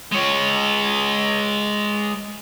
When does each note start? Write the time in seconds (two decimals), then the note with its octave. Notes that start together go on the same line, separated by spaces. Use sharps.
0.12 G#3 C#5